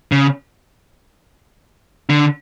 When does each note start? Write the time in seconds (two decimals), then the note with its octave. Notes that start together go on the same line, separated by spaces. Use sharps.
0.12 C#3
2.10 D3